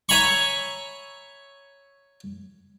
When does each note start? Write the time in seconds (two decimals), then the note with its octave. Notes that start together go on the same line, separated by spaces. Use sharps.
0.09 C#5 E5 G#5 A#5 B5 C#6